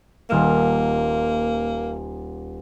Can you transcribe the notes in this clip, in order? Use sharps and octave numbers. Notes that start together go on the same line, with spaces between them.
D#1 A#3 F6 E7